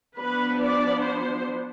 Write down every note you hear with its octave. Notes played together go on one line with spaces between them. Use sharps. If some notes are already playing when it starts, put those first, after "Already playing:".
F3 B3 D4 B4
D5
C5